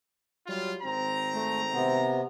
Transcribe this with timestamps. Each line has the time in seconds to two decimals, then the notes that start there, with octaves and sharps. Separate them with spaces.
0.47 F#3 G3 F4
0.83 G#1 C4 A#5
1.34 A3
1.73 C3 B3